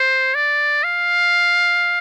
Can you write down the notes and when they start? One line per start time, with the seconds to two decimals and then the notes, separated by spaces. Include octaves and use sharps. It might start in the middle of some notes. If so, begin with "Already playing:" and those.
Already playing: C5
0.35 D5
0.84 F5